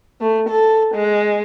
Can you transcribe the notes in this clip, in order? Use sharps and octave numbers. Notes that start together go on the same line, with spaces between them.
A3
A4
G#3